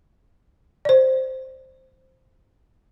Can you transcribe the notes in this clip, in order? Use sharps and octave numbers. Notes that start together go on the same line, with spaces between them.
C5 D5